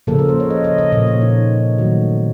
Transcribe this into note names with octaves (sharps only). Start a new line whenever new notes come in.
C#3 F3 A#3 A4
A#4
C5
C#5
D#5
D#5
D#5
A#2 F3 A#3 D#5
C#5
D#4
D#3 F#3 A3 F#4